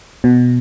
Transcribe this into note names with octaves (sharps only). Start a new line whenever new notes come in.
B2